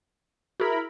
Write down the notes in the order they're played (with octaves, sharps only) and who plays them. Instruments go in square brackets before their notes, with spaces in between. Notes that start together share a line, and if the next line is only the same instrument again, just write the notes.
[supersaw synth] E4 A#4 B5 [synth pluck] F#4 G#4